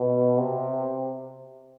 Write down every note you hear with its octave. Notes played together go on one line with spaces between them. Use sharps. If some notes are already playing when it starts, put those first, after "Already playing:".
Already playing: B2
C3